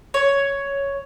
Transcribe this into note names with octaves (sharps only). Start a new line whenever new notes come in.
C#5